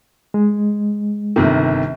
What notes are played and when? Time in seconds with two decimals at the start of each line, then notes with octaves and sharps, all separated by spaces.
0.34 G#3
1.36 G1 C3 D#3